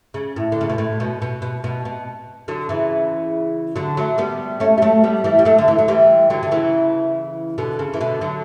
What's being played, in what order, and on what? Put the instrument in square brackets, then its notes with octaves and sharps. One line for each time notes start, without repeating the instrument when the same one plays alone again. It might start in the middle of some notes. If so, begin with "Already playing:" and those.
[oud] C#3
A2
D3
C#3
B2
A2
B2
B2
B2
B2
B2
D3 F#3
C#3 E3
D3 F#3
F#3 A3
G3 B3
A3 C#4
G3
F#3 A3
G3 B3
E3 G3
G3
F#3 A3
D3
E3
F#3
E3 G3
D3 F#3
D3
C#3 E3
B2 D3
C#3
E3
B2 D3
D3 F#3